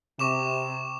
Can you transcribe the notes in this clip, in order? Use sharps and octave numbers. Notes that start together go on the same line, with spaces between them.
C3 C#6 D6 E7